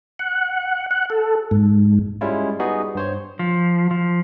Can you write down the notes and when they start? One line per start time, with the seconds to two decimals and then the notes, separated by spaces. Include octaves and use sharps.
0.19 F#5
0.91 F#5
1.10 A4
1.51 G#2
2.21 G3 G#3 C#4 E4 F4
2.59 G3 B3 D#4 F#4 G#4
2.95 G2 C5 C#5
3.39 F3
3.91 F3